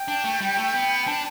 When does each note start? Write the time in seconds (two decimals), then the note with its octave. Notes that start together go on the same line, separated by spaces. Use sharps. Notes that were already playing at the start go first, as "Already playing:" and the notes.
Already playing: G5
0.08 D4
0.24 A3
0.41 G3
0.58 A3
0.74 B3
1.07 D4 A5